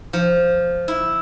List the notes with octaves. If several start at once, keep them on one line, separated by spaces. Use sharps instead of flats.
F3
E4